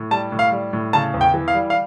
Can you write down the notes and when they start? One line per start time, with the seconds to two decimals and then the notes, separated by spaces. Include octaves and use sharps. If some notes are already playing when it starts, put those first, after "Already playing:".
Already playing: A2
0.11 G3 A5
0.32 A2
0.39 F5
0.52 G3
0.73 A2
0.93 C#3 A5
1.14 E2
1.21 G5
1.34 E3
1.48 F5
1.54 G3
1.70 F5